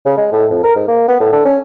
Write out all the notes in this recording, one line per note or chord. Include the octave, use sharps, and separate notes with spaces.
C#3
G#3
A2
F2
A#4
G#2
A#3
B3
A2
D3
C#4